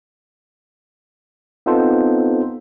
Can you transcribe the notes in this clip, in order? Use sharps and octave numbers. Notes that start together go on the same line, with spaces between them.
B3 C4 D#4 F4 A4 C5